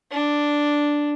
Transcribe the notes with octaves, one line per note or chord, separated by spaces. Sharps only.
D4